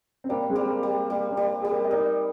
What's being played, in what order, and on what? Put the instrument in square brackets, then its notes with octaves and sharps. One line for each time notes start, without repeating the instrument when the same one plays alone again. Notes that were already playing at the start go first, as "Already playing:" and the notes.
[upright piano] C4
[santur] G3 [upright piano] A#3 D4
[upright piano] D4
G#3 C4
[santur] G3
[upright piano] A#3
[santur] G3
[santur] G3 [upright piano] A#3
[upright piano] A#3 D4
[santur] G3
[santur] G3 [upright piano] G#4
[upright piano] G4 A#4
D#5
[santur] D#4 [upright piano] A#4 D5